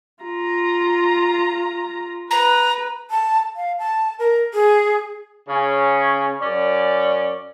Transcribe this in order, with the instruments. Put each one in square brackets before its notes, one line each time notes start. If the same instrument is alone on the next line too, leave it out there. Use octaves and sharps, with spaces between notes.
[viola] F4 A#5
[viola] B4 [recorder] A#5
[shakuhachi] A5
F5
A5
A#4
G#4
[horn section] C#3 C#4
F#2 C#4 D5